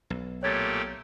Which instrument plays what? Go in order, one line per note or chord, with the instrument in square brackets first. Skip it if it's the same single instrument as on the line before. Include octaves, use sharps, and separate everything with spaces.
[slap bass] B1
[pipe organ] A#2 A3 G4 [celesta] C#5 G#6 A6